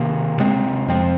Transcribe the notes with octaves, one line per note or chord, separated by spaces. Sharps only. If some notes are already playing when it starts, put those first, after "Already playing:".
Already playing: C3 D#3 A#3
C3 G#3 C4
F2 F3 C4